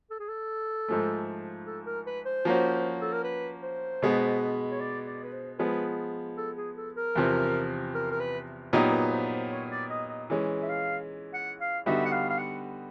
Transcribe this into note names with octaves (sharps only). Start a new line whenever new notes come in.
A4
G#4
A4
G#2 F3 A3
A4
A#4
B4
C5
F3 A#3 C#4 F#4
A4
A#4
B4
C5
B2 G#3 B3
C#5
D5
D5
B4
C5
F3 G#3 B3 B4
A4
G#4
A4
A#4
E2 C3 F3
A#4
A#4
B4
A#2 F#3 B3 D#4 G4 A#4
B4
B4
C5
C5
C#5
D5
D#5
D#5
E3 G#3 C#4
E5
F5
F#5
F5
D3 G3 B3 D#4 F#4 E5
F#5
F5
F5
F#5